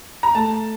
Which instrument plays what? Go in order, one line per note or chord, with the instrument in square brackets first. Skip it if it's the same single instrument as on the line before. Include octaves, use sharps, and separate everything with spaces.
[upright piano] A#5
[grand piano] A3 [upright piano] A5